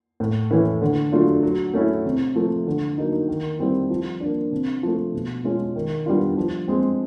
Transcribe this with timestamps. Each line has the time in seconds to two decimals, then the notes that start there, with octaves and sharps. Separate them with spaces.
0.20 A2
0.51 E3 A3 C#4 E4
0.81 D3
1.12 F#3 A3 D4 F4
1.43 F#3
1.74 A3 C#4 E4
2.05 C3
2.36 F3 A3
2.67 D3
2.98 F#3 A#3 D#4
3.29 D#3
3.59 G3 C4 E4
3.90 F3
4.20 A#3 D4
4.52 C3
4.83 F3 A3
5.14 B2
5.44 G#3 C#4 F4
5.76 D#3
6.06 G3 B3 D4 F4
6.37 F3
6.68 G#3 C4